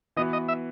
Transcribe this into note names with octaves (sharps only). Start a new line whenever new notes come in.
E3 B3 F#4 D#5
D#5
E5